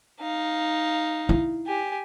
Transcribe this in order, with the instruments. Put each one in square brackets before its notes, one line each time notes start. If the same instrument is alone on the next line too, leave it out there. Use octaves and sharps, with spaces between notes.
[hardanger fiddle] D#4 F5
[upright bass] E4
[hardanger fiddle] G4 G#5